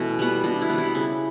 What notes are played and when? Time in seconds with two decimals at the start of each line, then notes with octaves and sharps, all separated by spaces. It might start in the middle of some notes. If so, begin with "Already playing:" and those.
Already playing: B2 E3 A3 C#4
0.19 G3 B3
0.44 B2 D4
0.61 E4
0.70 G3 B3
0.78 E4
0.95 C#3